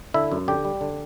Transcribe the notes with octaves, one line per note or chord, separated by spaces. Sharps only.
D3 E4 E5
F#2
D3 G4 G5
G3
D3